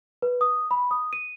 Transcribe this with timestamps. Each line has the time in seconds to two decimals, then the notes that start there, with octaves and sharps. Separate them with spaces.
0.22 B4
0.41 D#6
0.71 B5
0.91 D#6
1.13 D#7